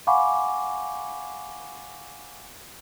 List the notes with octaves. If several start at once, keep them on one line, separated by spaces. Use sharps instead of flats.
F5 F#5 G#5 B5 C#6 D6